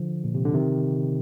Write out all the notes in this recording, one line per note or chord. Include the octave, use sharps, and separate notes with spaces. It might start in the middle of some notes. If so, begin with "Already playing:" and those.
Already playing: D3 F3
A#2
C3
D3
C3 D#3